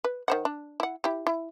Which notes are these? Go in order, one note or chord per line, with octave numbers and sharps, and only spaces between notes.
B4
D#3 C5 F#5
D4
E4 F#5
E4 G4
E4